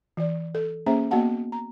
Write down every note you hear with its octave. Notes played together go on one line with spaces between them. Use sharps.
E3 D5
A4
A#3 C#4 G#4 C5 E5 A#5
A#3 B3 F#4 D#5 F#5 A5
A#5